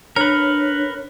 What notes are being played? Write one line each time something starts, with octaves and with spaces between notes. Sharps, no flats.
D4 A#4 B4 C#5